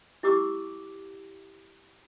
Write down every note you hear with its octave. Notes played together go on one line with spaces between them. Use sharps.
E4 G4 D6 E6